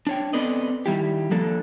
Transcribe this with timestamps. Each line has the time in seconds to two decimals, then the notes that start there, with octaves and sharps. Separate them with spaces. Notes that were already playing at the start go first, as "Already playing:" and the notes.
0.07 D4 C#5 G5
0.33 B3 C4 A4 B4 D5 D#5
0.86 D#3 G3 E4 G4
1.31 F3 A#3 D4 A4